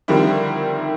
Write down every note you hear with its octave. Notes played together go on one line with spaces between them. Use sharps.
D3 D#3 F3 G3 C4 E4